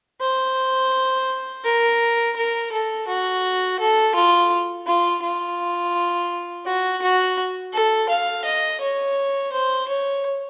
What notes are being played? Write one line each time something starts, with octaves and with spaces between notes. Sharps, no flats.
C5
A#4
A#4
A4
F#4
A4
F4
F4
F4
F#4
F#4
A4
F5
D#5
C#5
C5
C#5